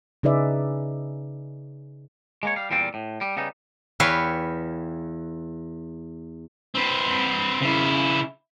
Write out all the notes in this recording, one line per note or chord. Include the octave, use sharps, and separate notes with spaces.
C#3 D#4 G#4 B4 D5 E5
G#3 A#3 C#5
G3 F5
E2 A#2 G3 C4 F4
A2
G3
C#3 G3 B3 D#4
E2 B4 C#5 F5 G5
C4 B4
C#3 E4